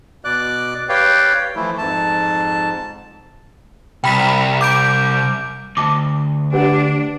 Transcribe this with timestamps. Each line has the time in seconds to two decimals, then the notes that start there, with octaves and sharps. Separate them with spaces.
0.25 B2 D5 D6 F#6
0.89 G4 B4 C#5 D5 F5 G5
1.56 E3 F3 A3 E4
1.78 F2 G#2 A5
4.04 C2 G5 B5 B6
4.61 D6 G6 D7
5.77 D2 E5 A5 D6
6.53 D4 G4 B4 F#5